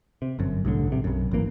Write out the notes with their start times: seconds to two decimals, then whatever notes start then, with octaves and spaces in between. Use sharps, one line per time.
0.22 C3
0.39 G1 F#2
0.65 C2 A2 D3
0.88 A#1 C3
1.04 B1 F#2
1.31 G#1 F#2 E3 A#3